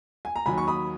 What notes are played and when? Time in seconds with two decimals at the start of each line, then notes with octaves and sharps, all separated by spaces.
0.25 G#5
0.36 A#5
0.46 D#2 D#3 F#3 G#5 B5
0.58 C#6
0.67 B5 D#6